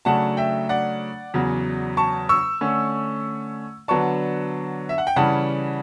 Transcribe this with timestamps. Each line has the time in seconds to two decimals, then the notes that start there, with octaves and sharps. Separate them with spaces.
0.05 C#3 F#3 A3 D4 F#5 A5
0.37 E5 G5
0.69 D5 F#5
1.34 E2 C#3 F#3
1.97 A5 C#6
2.29 C#6 E6
2.61 D3 A3 C#4
3.88 D3 F#3 B3 D4 A5 C#6
4.89 E5
4.98 F#5
5.07 G5
5.16 C#3 E3 G3 C#4 F#5 A5